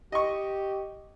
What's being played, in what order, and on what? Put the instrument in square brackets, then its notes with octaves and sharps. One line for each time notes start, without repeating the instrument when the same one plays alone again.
[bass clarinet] G4 [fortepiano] D#5 C#6